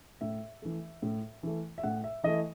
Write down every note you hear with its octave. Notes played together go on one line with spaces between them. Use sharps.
A2 E5
E3 A3
A2
E3 A3
E5
A2 F#5
E5
E3 A3 E4 D#5